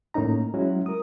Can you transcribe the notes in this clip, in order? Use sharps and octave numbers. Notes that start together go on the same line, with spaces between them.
A2 A#3 C#4 D#4 A#5
F#3 G#3 C#4 E4 F#4
A#4 D#6